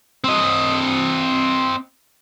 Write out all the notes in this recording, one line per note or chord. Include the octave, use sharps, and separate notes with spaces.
C4 D#5